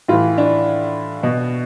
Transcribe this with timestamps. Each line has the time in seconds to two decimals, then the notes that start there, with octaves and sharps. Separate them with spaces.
0.08 A2 E3 F4
0.38 D4
1.23 B2